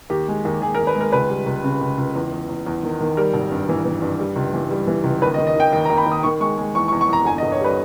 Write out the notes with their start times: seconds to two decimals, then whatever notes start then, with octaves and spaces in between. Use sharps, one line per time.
0.10 D#2 G4
0.28 G#3
0.45 D#2
0.61 D#2 G#4
0.75 A#4
0.79 D#2
0.87 B4
0.95 G#3
1.01 A#4
1.12 C#2 B4
1.29 G3
1.46 C#2
1.64 C#3
1.81 C#2
1.98 C#2
2.16 E2
2.33 E2
2.49 E2
2.66 E2
2.83 D#3
3.00 D#3
3.17 G3 A#4
3.34 G#1
3.52 G2
3.69 E3
3.85 E3
4.02 G2
4.20 G3
4.36 C#2
4.53 E3
4.71 G3
4.87 E3
5.04 C#2
5.22 D#2 B4
5.34 D#5
5.38 D#3
5.47 D#5
5.56 D#2 G5
5.73 D#2
5.85 A#5
5.90 D#2
5.98 B5
6.06 D#2
6.12 D#6
6.23 D#3 C#6
6.40 G#3 C#6
6.58 G#3
6.75 E2 C#6
6.88 C#6
6.92 E2
7.01 C#6
7.09 E2 A#5
7.25 G1 G#5
7.38 D#5
7.43 G1
7.52 C#5
7.61 G3 B4